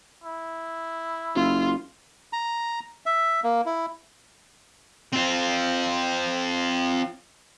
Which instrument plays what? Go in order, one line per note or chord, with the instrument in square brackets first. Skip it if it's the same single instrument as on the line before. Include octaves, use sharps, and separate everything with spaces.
[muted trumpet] E4
[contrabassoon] F#1 [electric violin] F4
[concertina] A#5
E5
A#3
E4
[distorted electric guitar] C4 F4